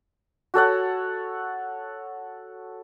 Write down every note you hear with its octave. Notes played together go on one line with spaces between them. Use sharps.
F#4 A4 C#5 F#5